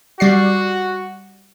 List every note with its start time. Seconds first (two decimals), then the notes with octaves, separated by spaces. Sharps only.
0.20 G3 F#4 D5 C7